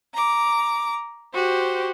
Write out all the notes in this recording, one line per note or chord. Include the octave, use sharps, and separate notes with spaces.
A#5 D6
F#4 G4 C5